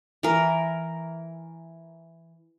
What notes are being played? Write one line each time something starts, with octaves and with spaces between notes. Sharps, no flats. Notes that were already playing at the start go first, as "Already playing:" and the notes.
E3 A#4